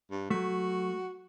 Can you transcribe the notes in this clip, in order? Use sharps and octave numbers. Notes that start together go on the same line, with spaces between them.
G2
F#3 A3 F#4